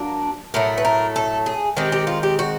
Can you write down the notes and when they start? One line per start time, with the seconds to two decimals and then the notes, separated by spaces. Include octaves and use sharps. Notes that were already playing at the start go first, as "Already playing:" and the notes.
Already playing: F#3 A#3 D4
0.54 A2 F#3 A3 A#4
0.78 B4
0.85 A#4
1.16 A4
1.46 G#4
1.77 D#3 G#3 C4 G4
1.92 G4
2.07 F4
2.23 G4
2.39 F#4